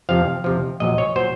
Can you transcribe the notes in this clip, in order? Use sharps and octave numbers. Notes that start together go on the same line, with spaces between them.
F2 C3 F3 F5
F2 C3 F3
A#1 A#2 F#3 D#5
C#5
A#2 F#3 C5